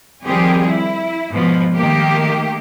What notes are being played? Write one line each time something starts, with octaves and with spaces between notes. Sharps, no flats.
D#3 F3 G3 C4 G4 G#4
E4
G#2 B2 F3 G#3
D#3 A3 A#3 G4